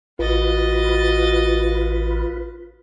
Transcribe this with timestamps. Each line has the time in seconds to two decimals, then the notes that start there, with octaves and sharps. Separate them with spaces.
0.19 A1 F4 F#4 B4 D#5 A6